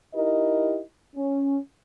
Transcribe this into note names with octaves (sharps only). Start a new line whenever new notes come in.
D#4 E4 G4 A#4 D#5
C#4